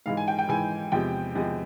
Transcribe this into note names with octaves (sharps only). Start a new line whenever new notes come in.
G#2 E3 G#3 F5
G#5
G5
G5
G#2 E3 G#3 G#5
E2 C3 F3 G#3 G5
E2 C3 F3 G#3